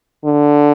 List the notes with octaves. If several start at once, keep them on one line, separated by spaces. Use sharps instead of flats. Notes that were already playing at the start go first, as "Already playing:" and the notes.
D3